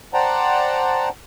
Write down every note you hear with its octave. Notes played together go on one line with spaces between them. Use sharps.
C5 D5 F#5 G5 A5 A#5